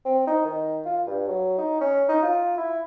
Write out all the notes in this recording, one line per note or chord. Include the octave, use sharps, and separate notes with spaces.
C4
D#4
D#3
F4
G2
F#3
D#4
C#4
D#4
F4
E4